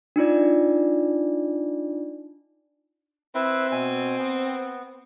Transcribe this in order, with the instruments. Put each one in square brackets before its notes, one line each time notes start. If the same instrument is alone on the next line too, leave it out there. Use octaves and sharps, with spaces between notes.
[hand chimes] D4 D#4 F4 D5
[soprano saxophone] C4 [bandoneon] E4 B4 E5
[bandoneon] B2 G#5
B3